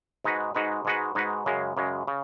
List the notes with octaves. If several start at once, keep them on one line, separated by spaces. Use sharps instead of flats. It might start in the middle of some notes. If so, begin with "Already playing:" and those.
G#2 G#3 D#4 F#4 B4
G#2 G#3 D#4 F#4 B4
G#2 G#3 D#4 F#4 B4
G#2 G#3 D#4 F#4 B4
F#2 C#3 G#3
F#2 C#3 G#3
C#3